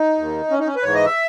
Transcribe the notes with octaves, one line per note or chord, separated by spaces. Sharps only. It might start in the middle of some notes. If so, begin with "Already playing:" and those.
Already playing: D#4
D#2 D#3
C#4
D#4
C#4
B4
G#2 E3 C#5
D#5
E5